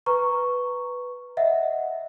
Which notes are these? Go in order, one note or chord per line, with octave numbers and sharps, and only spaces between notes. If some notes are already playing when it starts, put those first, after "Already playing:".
B4 A#5 C#6
D#5 E5 F#5